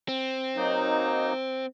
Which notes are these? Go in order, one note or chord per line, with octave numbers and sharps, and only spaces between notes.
C4
F#3 A#3 D#4